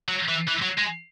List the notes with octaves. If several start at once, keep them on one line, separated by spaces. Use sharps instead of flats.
F#3
E3
E3
F#3
G#3